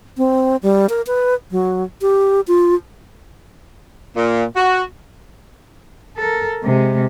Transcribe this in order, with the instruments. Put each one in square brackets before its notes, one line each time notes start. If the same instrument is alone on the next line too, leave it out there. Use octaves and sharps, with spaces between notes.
[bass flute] C4
G3
A#4
B4
F#3
G4
F4
[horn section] A#2
F#4
[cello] A4 A#4
C3 G#3